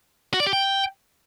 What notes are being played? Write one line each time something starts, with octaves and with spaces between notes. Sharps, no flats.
F#4
D5
G4
G5